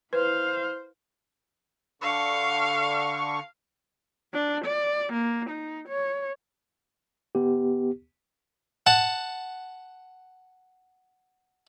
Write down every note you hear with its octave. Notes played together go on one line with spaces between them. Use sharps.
E4 B4 C5 F5
D3 F5 C#6
D4
D5
A#3
D#4
C#5
B3 G4
F#5 A5